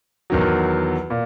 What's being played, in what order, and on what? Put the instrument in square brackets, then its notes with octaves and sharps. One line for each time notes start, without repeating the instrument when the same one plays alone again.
[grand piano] E2 D#3 F#3
A#2